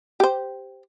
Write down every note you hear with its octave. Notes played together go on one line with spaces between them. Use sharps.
G4 C5